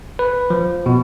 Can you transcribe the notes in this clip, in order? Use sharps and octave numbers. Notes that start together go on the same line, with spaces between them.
B4
F3
B2